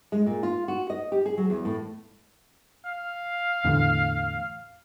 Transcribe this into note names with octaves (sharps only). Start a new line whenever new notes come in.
G#3
A#2
F4
F#4
D#5
G4
G#4
F#3
E2
A2
F5
E2 A2 D3